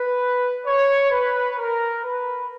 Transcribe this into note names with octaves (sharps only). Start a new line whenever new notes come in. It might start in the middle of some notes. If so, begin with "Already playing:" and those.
Already playing: B4
C#5
B4
A#4
B4